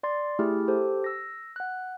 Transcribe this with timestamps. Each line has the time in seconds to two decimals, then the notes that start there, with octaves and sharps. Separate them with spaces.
0.03 D5 C6 A6
0.39 A3 E4 G4 G#4 F6
0.68 G4 A4 C5
1.04 E6 A#6
1.56 F#5 F#6